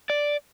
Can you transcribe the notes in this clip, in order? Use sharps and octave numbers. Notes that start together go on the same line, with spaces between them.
D5